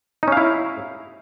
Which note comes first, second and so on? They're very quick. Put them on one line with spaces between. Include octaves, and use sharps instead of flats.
D#4 C#4 F5 E4